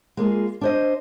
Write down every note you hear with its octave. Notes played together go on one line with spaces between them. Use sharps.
G#3 A#3 F4 G#4
D4 C5 D#5